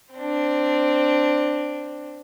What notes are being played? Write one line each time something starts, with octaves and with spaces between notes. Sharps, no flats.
C4 D4